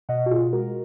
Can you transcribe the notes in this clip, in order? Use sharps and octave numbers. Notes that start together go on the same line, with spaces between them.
B2 D#5 F#5
F#4
B2 F4 G#4
G#3 F#4 A#4